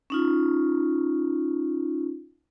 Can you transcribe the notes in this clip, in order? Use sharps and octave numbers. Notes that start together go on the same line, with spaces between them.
C#4 D#4 F4